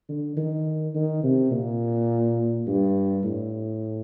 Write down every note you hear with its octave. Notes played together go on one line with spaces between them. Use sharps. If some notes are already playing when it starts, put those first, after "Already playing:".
D3
D#3
D#3
C3
A#2
G2
A2